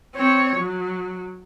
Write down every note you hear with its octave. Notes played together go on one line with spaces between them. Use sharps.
C4 C#5
F#3